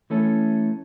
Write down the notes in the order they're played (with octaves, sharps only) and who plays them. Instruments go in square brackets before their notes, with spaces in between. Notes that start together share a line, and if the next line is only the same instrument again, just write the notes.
[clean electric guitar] E3 A3 C#4 A4